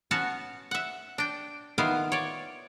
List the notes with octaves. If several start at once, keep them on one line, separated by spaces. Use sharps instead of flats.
B3 C#4 F#4 C#5 A5
E5 F#5
D4 G5
D#3 B3 E4 F4 F5
C#5 D5